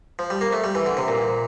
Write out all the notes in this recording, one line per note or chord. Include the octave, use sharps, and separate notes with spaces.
F3
G3
A#3
A3
G3
E3
D3
C3
A#2